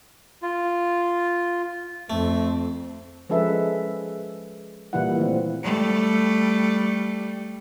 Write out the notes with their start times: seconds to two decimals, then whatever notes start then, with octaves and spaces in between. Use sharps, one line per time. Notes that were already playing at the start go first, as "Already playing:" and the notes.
0.42 F4
2.10 F2 A3 C4
3.30 F3 G#3 C#4 A4 B4 E5
4.93 A#2 E3 G3 A#3 E4 F#5
5.18 D#3 A3 C4
5.63 G3 A3